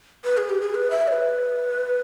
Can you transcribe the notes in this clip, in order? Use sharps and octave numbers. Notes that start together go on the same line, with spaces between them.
B4
G#4
G4
G#4
B4
E5
C#5
B4